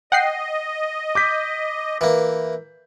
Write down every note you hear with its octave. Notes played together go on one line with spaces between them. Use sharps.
D#5 F#5 G5 C7
D6 G6 B6
E3 A#3